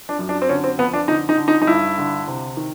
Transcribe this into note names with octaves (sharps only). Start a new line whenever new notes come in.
D4
F#2
D4
C4
D3 C#4
C4
F2 B3
D4
D3 D#4
D#4
D3
D#4
D#4
G2 E4
D3
C3
D#3